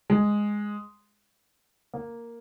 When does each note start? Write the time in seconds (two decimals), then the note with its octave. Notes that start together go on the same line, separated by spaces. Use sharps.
0.10 G#3
1.93 A#3